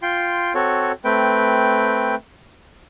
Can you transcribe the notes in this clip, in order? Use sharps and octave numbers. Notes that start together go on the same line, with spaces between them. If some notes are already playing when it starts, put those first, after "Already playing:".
F4 G5 C6
C4 F#4 A4 C#5
A3 C4 B4 G5